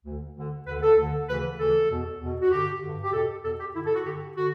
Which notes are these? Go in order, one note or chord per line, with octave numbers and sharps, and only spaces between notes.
D2 D3
D2 D3
D2 D3 B4
A4
D2 D3
D2 C#3 E3 B4
D2 C#3 E3 A4
E2 B2
E2 B2
F#4
G2 D3 G4
G2 D3
G4
E2 B2 A4
E2 B2 A4
G4
G2 D3 E4
A4
F#4
G2 D3 G4
D3 F#4